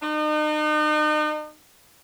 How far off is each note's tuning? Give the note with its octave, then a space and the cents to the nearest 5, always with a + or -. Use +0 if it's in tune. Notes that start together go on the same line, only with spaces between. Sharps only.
D#4 -40